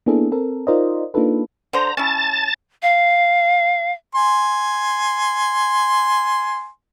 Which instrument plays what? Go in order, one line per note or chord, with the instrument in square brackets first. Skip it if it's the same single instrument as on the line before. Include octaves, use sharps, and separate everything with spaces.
[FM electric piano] A#3 B3 D4 E4 G#4 A4
C4 A4 A#4
D#4 F4 A#4 C5 D5 D#5
A#3 D4 D#4 F4 A4 B4
[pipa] D3 C5 [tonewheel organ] A#5
[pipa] C#4 E4 [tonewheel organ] A5 A6
[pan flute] F5
[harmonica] G#5 C6